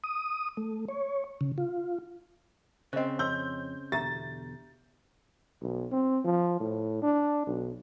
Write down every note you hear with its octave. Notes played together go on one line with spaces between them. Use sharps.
D#6
A3
C#5
C#3
F4
C#3 C4 C5 D#5
F2 C#4 C6 E6 G6
E2 B2 D3 G4 E5 A#5 A6
B1
C4
F3
A2
D4
B1